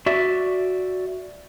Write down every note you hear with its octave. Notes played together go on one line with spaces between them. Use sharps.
F#4 D5 E5